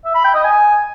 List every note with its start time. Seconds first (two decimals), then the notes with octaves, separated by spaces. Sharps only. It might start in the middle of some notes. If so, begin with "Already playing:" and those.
0.05 E5
0.15 B5
0.25 G5
0.34 D#5
0.44 G#5